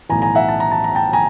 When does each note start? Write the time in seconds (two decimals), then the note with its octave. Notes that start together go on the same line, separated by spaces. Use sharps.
0.09 B1 A2 E3 G#5 A#5
0.22 G#5 A#5
0.35 E5 F#5
0.49 A5
0.60 A#5
0.72 A5
0.84 A#5
0.95 G5 A5
1.13 G#5 A#5